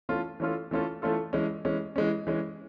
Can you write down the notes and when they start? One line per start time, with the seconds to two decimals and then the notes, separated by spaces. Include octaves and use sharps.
0.09 E3 A3 C#4 F4 A4
0.40 E3 A3 C#4 F4 A4
0.71 E3 A3 C#4 F4 A4
1.02 E3 A3 C#4 F4 A4
1.33 E3 G#3 C#4
1.65 E3 G#3 C#4
1.96 E3 G#3 C#4
2.27 E3 G#3 C#4